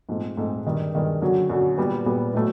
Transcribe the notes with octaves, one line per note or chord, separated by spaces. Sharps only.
G#2 F3 A3 C4
G#2 F3 A3 C4
G2 D#3 G#3
G2 D#3 G#3
F#2 D3 F#3
F#2 D3 F#3
A#2 G3 B3
A#2 G3 B3
A2 F#3 A3